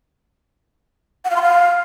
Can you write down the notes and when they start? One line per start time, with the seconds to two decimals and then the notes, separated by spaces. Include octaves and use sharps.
1.25 F#5
1.30 F5
1.36 C6
1.42 F5